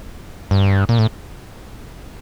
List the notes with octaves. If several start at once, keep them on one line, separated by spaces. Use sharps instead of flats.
G2
A#2
A2